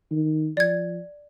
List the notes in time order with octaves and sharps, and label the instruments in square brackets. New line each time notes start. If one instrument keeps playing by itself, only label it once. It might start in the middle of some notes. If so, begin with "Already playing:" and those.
[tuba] D#3
[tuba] F3 [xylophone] D5 G#6